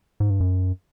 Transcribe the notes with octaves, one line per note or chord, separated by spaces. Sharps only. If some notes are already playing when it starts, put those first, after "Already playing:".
G#2
G2
F#2